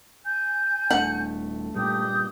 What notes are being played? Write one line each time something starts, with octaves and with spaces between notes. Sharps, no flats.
G#5 G6
D#1 A3 D4 F#5
G2 A#2 G4 D#6 G6